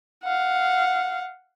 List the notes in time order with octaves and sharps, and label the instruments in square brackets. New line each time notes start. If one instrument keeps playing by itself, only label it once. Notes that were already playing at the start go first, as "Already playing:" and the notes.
[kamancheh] F5 F#5